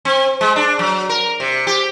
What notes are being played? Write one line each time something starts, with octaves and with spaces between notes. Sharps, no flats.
C4
G#3
D4
F#3
A#4
C3
G4